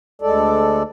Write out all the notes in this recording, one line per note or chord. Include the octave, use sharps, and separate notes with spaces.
D2 G#3 A4 D5